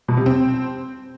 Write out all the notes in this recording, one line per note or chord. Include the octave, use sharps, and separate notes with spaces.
B2
C3
C4